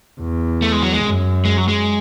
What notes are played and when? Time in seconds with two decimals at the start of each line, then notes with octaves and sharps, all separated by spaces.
0.21 E2
0.62 A3
0.72 G#3
0.83 F#3
0.93 G#3
1.04 F#2
1.45 G#3
1.58 F#3
1.68 G#3